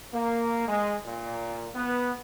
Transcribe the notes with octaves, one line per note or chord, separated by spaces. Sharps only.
A#3
G#3
A#2
B3